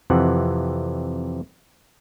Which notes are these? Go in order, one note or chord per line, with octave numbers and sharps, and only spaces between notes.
F2 C3 E3 F#5